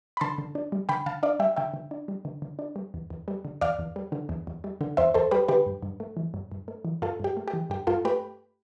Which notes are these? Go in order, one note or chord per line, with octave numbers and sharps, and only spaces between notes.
B5
D3 A5 C6
D3
D4
G3
D3 G5 B5
D3 F5 A5
D4 D5 F5
G3 E5 G5
D3 E5 G5
D3
D4
G3
D3
D3
D4
G3
E2
E2
G3
D3
E2 D5 F5
E2
G3
D3
E2
E2
G3
D3
E2 C5 E5
E2 A4 C5
G3 G4 B4
D3 G4 B4
G2
G2
A3
E3
G2
G2
A3
E3
G2 F4 A4
G2 G4
A3
G4
E3
G2 G4
G2 F4 A4
A3 G4 B4